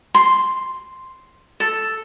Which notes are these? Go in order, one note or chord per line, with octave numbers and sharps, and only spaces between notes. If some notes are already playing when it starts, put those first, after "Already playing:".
C6
A4